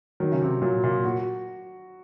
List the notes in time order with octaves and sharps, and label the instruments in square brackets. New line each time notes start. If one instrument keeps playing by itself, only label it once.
[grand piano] D#3 [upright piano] F#3
[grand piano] C#3
C3
[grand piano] A#2 [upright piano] F#3
[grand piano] A#2
[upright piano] F#4